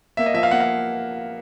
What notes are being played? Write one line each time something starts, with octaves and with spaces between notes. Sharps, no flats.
A#3 E5
D#5
F3 E5
F5
A#3 F#5
F5